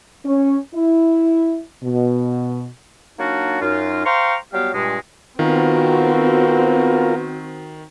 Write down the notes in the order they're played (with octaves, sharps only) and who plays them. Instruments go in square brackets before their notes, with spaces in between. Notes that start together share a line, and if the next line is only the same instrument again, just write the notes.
[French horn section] C#4
E4
B2
[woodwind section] F#3 A#3 D4 D#4 F4 F#4
F#2 D#4 F4
C5 F5 G5 A#5 C6 C#6
F#3 G3 B3 G4 F5
G2 A#2 G#3
[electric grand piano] D#3 [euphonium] B3 [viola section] C4 F#4 [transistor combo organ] F4 A#4